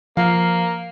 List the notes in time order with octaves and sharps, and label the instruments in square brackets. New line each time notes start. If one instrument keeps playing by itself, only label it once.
[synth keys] F3 [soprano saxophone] A#3 [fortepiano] F5